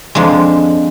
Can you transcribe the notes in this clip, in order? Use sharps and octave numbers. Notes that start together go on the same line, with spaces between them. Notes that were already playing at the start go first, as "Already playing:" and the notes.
F2 F3 G#3 D4